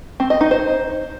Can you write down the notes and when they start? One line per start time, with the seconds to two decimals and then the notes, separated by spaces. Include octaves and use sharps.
0.20 C4
0.30 D#5
0.41 D#4
0.51 C5